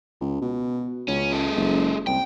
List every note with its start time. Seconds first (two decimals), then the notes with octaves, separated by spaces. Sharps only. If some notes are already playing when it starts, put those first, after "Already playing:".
0.21 C#2
0.41 B2
1.08 C#2 C#4
1.32 G#3 A4
1.57 F#1
2.07 C2 G5